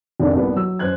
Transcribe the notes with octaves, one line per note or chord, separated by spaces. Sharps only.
F1 A#1 F2 D#3 D4 A#4
C2 G3 A#3 B3
F#3 E6
F#2 C5 F#6 G#6